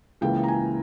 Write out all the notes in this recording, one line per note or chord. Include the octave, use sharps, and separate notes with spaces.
C#2 C#3 E3 A#3 G5
A#5
G#5